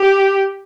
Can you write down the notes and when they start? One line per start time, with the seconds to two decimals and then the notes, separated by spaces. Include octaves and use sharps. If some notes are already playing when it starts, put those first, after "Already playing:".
Already playing: G4